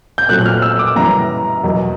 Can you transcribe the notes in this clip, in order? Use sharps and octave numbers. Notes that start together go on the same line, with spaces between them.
G6
A#2 F#3 A3 C4 F#6
F#6
F6
E6
D6
F#2 C#3 E3 G3 A#5
E2 B2 F#3 A#3